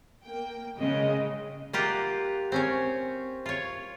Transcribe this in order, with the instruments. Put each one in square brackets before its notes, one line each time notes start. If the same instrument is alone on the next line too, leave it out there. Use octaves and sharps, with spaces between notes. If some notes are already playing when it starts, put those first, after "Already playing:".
[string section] A#3 G5
[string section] C#3 G#3 [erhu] D#5
[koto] A#3 F4 G4 F#5
C4 C#4 C#5
F4 C#5